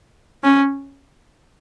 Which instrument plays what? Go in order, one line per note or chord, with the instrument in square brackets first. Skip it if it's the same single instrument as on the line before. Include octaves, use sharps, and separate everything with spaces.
[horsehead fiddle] C#4